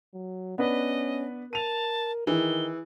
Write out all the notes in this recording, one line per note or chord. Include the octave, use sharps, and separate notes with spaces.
F#3
B3 C#4 D4 B4 D#5
A#4 A5 D#7 F7
D#3 E3 G#4 G7